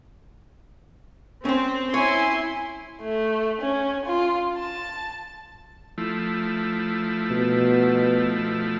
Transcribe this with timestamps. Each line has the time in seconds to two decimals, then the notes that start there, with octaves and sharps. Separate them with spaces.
1.45 C4 C#4 C5
1.94 E4 C#5 G#5 C6
3.02 A3
3.61 C#4
4.06 F4
4.57 A5
5.98 F3 A3 E4
7.31 B2